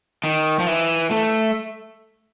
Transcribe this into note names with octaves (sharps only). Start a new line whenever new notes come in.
D#3
F3
E3
A3